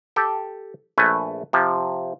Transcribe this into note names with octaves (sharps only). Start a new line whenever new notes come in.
G4 A4 G5
A#1 A3 B4 G#5
C3 F3